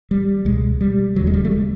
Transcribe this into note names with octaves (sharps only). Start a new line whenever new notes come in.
G3
C#2 B2 G#3
G3
E1 D#2 C#3 F#3
G#3
G3
A3
G#3